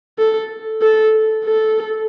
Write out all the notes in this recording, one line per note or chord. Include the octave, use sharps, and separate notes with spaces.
A4
A4
A4